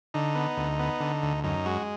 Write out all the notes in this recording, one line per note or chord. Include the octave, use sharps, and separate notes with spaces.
D3 D#4
B3
D2
B3
D3
D2
F#2 D#4
G#3 F#4